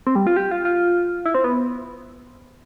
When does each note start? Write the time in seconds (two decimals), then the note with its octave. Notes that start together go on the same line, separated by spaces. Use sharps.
0.07 C4
0.15 G3
0.27 F4
0.36 G4
0.51 F4
0.65 F4
1.26 E4
1.35 C4
1.44 B3